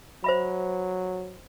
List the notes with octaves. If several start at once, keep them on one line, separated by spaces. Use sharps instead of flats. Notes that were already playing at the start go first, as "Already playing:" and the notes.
F#3 C5 E5 B5